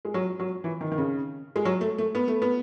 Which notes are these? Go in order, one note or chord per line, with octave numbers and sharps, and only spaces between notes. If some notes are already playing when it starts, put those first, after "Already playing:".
G#3
F#3
F#3
E3
D#3
D#3
C#3
G#3
F#3
A3
A3
B3
A3
B3